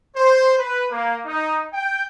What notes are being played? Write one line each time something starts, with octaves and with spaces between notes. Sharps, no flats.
C5
B4
A#3
D#4
G5